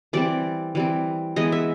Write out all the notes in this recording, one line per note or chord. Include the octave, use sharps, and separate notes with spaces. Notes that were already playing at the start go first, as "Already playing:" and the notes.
E3 G3 C4 D5
E3 G3 C4
E3 G#3 B3 D#5
E5